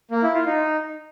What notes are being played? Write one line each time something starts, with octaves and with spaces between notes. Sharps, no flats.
A#3
E4
F4
D#4